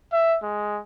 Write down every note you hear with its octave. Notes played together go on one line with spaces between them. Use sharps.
E5
G#3